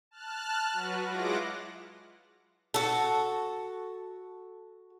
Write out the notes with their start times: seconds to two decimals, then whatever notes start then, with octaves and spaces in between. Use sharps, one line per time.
0.11 A5 F6 F#6
0.73 F#3 F#4 B4
1.05 G#3 E4 F4 F#5 D6 A#6
2.74 F#4 A4